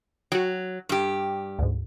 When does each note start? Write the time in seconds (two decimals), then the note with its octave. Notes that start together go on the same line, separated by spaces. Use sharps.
0.32 F#3 F#4 G5
0.89 G2 G4
1.59 D2 G#2